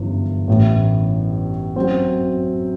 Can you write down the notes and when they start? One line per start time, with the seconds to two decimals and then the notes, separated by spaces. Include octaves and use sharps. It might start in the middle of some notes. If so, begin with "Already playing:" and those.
Already playing: G1 F#2 E3
0.47 A1 A2 E3
1.76 F#2 F#3 C4 F#4